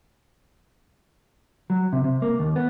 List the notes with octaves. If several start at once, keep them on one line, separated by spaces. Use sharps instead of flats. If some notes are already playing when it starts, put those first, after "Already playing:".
F#3
C3
C3
A#3
D#2
B3